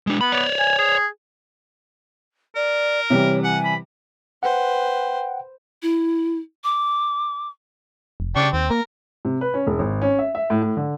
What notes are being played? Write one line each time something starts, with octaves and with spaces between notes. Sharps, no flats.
G#3 D4
B3 B5
C#5 D5
G#5
G#4
A#4 D5
C3 E3 G3 C#5
F#5 G#5
B5
B4 C5 F#5 G5
E4
D6
F1
C#3 D4 G4 C#6
D#2 C4
A#3 A#4
C3
B4
C#4
E1
G#1
C#4
E5
E5
A2
A2
D3